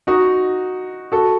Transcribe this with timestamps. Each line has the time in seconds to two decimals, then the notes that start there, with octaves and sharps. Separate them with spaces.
0.07 D#4 F#4
1.12 F#4 A4